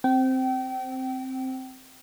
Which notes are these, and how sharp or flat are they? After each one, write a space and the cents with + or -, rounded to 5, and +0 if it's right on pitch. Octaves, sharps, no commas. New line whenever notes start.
C4 +0 G5 -30